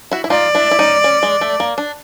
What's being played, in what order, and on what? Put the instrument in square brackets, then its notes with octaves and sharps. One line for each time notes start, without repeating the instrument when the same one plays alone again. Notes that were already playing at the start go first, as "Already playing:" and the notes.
[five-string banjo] E4 F#4
E4
[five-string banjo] D#4 F4 [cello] D5
[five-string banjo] D4 E4
E4
C#4 D#4
C#4
G#3
A3
A#3
D4